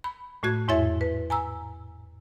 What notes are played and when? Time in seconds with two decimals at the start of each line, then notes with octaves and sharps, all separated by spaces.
0.04 B5
0.43 A2 A3 F#4 G#6
0.68 E2 G#2 E4 C#5 E5 A6
1.01 B4
1.30 G#5 A#5 E6